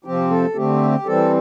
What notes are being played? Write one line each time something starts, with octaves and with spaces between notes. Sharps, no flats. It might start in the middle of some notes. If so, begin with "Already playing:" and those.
C3 F3 C4 G4
A4
D3 A3 C4 G4
E3 G3 C4 A4